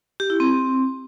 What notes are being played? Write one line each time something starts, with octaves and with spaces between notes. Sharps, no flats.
G4
E4
C4